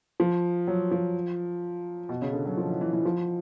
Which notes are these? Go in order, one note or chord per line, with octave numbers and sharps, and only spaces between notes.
F3
F#3
F3
B2
C#3
D3
F#3
F3
E3
E3
E3
F3